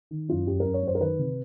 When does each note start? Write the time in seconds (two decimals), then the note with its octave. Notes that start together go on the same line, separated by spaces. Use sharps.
0.11 D#3
0.29 F#2 F4
0.47 F#2 G4
0.60 F#2 A#4
0.74 C#5
0.83 F#2 C5
0.95 A#4
1.01 D#3 B4
1.19 C3